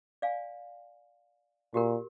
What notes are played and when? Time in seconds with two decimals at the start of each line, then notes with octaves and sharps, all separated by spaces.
0.22 D5 F5 G#5
1.74 A#2 F#4 G4 A#4